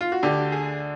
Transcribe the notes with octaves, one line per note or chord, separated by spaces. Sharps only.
F4
F#4
D2 D3 G4
G#4